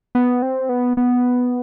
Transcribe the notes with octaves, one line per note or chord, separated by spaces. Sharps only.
B3
C4
B3
B3